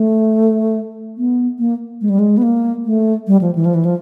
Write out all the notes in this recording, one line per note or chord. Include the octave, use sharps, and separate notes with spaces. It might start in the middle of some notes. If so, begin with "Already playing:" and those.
Already playing: A3
B3
A#3
G#3
G3
G#3
B3
A#3
A3
G3
F3
E3
F3
E3
F3